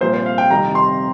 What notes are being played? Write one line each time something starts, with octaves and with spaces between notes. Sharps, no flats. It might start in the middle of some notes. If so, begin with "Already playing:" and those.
C2 A#2 F3 A#3 C5
C5
F5
G5
F2 C3 D#3 G3 A#5
C6